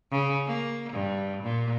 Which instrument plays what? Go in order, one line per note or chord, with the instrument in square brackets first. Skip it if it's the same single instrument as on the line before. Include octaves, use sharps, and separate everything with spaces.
[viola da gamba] C#3
A#3
G2
A#2